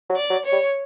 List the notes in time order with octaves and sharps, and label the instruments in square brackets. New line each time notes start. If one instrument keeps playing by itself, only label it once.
[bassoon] F#3
[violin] D5
[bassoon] F#3
[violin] C#5
[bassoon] G3